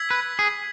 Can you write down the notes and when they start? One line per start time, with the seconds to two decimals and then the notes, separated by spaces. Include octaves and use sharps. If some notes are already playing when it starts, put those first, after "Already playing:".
Already playing: E6 G#6 B6
0.11 B4
0.39 G#4